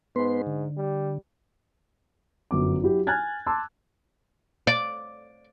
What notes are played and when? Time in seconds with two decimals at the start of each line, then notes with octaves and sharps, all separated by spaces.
0.16 G#2 B3 B4 C6
0.47 D3
0.77 G3
2.51 G1 F#2 D6
2.82 F#3 E4 G4
3.07 G#5 F6 F#6 G#6 A6
3.46 A5 C6 D6 E6
4.67 D5